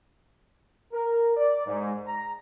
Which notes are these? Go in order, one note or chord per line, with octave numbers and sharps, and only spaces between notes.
A#4
D5
G#2
A#5